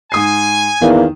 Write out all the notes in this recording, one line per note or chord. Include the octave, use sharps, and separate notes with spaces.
G#2 G#5 D#6 C7
E2 D#3 A#3